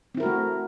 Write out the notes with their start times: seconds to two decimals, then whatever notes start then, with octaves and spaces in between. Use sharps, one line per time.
0.15 C4
0.17 E4
0.20 A#4
0.23 F#4
0.26 A3